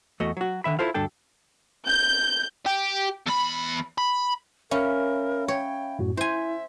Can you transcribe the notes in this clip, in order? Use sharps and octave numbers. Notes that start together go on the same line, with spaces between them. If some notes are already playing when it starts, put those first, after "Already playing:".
E2 A3 F#4 D#5
F#3 F#4
D3 D#3 E5 B5
E4 F4 A4 C5 F5
D2 G2 D4 A4 G5
G6
G4
E2 B5
B5
C#4 A#4 E5 F5 B5
C#5 G5
F#2 A2 F#4
E4 C5 E5 G#5